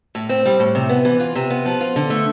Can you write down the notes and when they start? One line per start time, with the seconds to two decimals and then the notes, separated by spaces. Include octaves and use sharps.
0.15 A2
0.29 C4
0.46 G3
0.60 A2
0.75 C3
0.89 B3
1.05 E3
1.20 F4
1.36 C3
1.50 B3
1.65 F3
1.81 F4
1.96 D3
2.10 A3